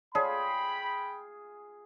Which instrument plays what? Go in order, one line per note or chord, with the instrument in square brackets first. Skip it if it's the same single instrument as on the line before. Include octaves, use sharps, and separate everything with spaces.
[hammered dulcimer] F4 G#4 [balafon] C#5 D5 A5 [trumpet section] G5 B5